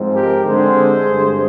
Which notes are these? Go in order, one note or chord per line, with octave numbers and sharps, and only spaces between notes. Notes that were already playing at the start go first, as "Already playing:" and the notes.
Already playing: G#2 F3 G#3 C4
G4 A#4
D3 G#3 C4 G#4 C5
G2 D3 G#3